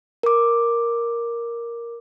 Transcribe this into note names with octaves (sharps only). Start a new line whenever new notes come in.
A#4 D6